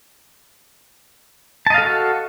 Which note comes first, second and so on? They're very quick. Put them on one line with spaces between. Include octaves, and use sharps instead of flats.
A5 D#5 F5 A4 F#4